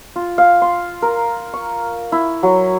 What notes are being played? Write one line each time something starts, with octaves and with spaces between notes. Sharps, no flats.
F4
F5
C6
A#4
C#6
E4
F#3